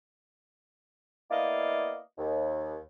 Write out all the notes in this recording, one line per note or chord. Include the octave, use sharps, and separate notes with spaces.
A#3 B3 E4 D5 D#5 F5
D#2